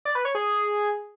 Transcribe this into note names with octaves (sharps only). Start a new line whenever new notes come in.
D5
B4
C#5
G#4